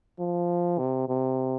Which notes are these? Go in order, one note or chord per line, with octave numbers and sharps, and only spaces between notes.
F3
C3
C3